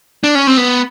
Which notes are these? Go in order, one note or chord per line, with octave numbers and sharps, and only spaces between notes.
D4
C#4
C4
B3